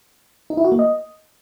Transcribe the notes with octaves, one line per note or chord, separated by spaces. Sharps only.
D#4
E4
F#4
A#3
D#5